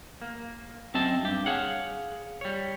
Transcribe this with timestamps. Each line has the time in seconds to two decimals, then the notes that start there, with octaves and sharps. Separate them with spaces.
0.22 A#3
0.94 F#2 C4 D#5 E5 A5
1.23 G2 G4
1.46 G#4 C#5 F5 F#5
2.41 G3 C#5